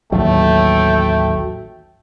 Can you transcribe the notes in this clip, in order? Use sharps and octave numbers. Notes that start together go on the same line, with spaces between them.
A1 D#2 F#3 A3 G5